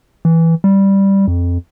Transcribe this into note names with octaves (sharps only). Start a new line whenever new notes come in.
E3
G3
F2